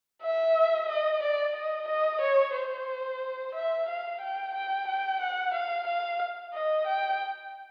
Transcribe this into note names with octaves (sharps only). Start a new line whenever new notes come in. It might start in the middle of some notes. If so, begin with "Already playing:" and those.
E5
D#5
D5
D#5
D#5
C#5
C5
E5
F5
G5
G5
G5
F#5
F5
F5
D#5
G5